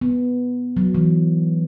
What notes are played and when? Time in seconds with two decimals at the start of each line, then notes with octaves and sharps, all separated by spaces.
0.01 B3
0.77 F#3
0.95 E3